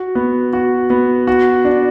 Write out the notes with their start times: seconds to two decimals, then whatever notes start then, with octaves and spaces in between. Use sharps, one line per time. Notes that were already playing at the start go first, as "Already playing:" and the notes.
Already playing: F#4
0.15 B3
0.53 F#4
0.90 B3
1.27 F#4
1.65 D4